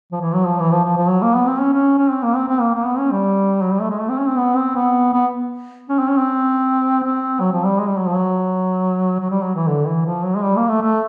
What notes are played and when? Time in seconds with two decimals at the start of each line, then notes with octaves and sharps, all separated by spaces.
0.12 F3
0.21 E3
0.34 F#3
0.46 F3
0.60 E3
0.72 F3
0.84 F3
0.97 F3
1.09 F#3
1.22 A#3
1.35 B3
1.47 C4
1.60 C#4
1.73 C#4
1.98 C#4
2.10 C4
2.24 A#3
2.36 C4
2.49 C4
2.61 A#3
2.74 A#3
2.86 B3
2.99 C#4
3.12 G3
3.62 F#3
3.72 G3
3.81 A3
3.90 G#3
4.00 A3
4.09 C4
4.19 C#4
4.29 C4
4.37 B3
4.56 C4
4.76 B3
5.14 B3
5.90 C#4
5.99 C4
6.09 C#4
6.18 C4
7.03 C4
7.40 F#3
7.53 F3
7.66 G3
7.79 G#3
7.87 G3
7.98 F#3
8.07 F3
8.16 F#3
9.20 F#3
9.30 G3
9.43 F#3
9.55 E3
9.68 D3
9.87 E3
10.06 F3
10.25 F#3
10.36 G#3
10.43 G3
10.57 A#3
10.68 A3
10.82 A3